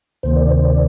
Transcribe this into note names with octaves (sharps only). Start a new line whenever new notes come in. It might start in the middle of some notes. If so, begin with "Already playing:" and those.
D2 C3 D#3 A#3 C5
D5
C5
D5